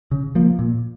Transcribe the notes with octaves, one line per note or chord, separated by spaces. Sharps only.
C#3
F3 A#3
A#2